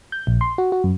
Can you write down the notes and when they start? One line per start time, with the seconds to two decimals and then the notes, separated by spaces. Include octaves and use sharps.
0.12 G6
0.27 A#1
0.41 C6
0.58 F#4
0.72 F#4
0.84 F#2